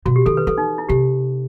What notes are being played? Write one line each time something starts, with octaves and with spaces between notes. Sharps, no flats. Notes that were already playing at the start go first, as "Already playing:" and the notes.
B2 F#4
G4
D#3 A4
B4
E3 A4
D#4
E4
C3 G4